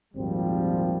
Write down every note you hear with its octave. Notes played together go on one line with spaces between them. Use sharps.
G#1 D#2 A#2 F3 G3 C4